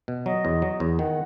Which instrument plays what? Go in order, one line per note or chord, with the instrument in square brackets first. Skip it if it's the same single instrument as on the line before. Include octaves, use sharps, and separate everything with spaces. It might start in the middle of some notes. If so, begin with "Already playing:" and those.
[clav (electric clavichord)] B2
[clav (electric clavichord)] F#3 [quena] D#5
[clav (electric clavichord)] E2
F#3
E2
[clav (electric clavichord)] D#3 [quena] F#5